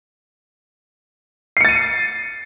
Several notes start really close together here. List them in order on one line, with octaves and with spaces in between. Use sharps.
C7 C#7 A6 D#7